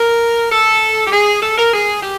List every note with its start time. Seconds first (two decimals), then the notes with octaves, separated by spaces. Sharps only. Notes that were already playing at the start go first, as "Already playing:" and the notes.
Already playing: A#4
0.52 A4
1.07 G4
1.12 G#4
1.42 A4
1.58 A#4
1.73 G#4
2.03 G4